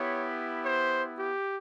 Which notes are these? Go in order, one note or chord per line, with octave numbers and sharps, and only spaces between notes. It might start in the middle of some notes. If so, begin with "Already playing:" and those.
Already playing: B3 E4 G4 C#5
C5
G4